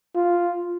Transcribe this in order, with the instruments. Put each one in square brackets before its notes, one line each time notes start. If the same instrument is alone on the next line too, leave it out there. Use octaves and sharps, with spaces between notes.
[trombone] F4